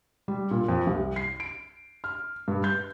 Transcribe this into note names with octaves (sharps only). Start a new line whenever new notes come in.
G3
A#2
F2
C2
C7
D7
F6
G2
G6